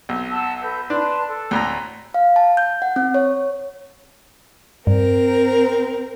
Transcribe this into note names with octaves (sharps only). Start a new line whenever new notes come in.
B1
F#5 A5 E6
A4 B4 G6
D4 B4 A5 C6
A4
D2 A2 A#5
F5
A5
G6
F#5
C4
C#5
G2 C4 A#4